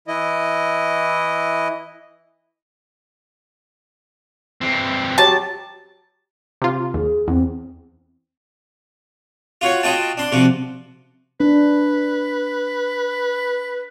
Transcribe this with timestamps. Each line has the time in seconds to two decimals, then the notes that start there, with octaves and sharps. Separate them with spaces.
0.08 E3 E4 D#5
4.61 E3 C4
5.18 F#3 G4 A5 A#5
6.62 C3 F4
6.94 D#2 G#4
7.28 E2 C4
9.61 F4 F#4 C#5
9.83 F4 F#4 D#5 G5 A5
10.17 D4 C6
10.32 C3 F3 F#4
11.40 D4 B4